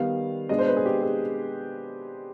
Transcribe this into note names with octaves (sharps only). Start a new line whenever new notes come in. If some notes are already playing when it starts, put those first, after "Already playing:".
Already playing: D#3 G3 B3 F5
B2 G#3 D4 D#5
C5
B4
G#4
G4
G#4